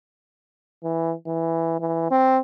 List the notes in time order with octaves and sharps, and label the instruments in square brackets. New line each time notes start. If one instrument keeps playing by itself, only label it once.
[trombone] E3
E3
E3
C4